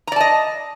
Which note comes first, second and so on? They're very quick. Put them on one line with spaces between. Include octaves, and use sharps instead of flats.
A#5 D5 A5 D#5